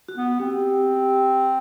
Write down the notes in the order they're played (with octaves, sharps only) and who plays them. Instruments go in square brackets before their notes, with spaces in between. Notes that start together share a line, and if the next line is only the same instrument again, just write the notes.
[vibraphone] F#4
[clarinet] B3
[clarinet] C4 [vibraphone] G4